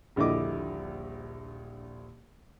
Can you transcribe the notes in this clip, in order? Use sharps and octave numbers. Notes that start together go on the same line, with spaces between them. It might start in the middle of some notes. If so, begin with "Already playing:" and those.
D#1 A#1 D3 E4 D#5 D6